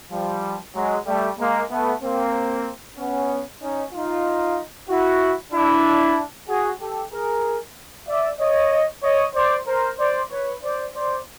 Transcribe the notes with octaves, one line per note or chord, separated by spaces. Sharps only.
F3 G3
F#3 G#3
G3 A3
G#3 A#3
A3 B3
A#3 C4
B3 C#4
C#4 D#4
D#4 F4
E4 F#4
D4 E4
F#4 G#4
G4 A4
G#4 A#4
D5 E5
C#5 D#5
C#5 D#5
C5 D5
A#4 C5
C5 D5
B4 C#5
C5 D5
C5 D5